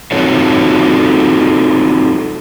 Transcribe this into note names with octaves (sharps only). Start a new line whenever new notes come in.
C4 D#4 F4 F#4 A4 C#5